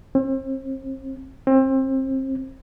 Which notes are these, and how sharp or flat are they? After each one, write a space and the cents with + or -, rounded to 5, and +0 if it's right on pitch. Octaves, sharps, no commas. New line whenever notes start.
C4 +40
C4 +30